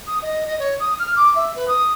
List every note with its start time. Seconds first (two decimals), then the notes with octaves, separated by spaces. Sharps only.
0.07 D#6
0.22 D#5
0.46 D#5
0.59 C#5
0.79 D#6
0.99 F6
1.16 D6
1.35 E5
1.55 B4
1.67 D#6